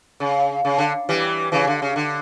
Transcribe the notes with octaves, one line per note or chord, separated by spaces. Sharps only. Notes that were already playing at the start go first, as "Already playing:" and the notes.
C#3
C#3
D3
E3 G3
C#3 E3
D3
C#3
D3